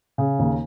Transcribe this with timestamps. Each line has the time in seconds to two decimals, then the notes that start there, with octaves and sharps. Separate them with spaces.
0.18 C#3
0.39 D#2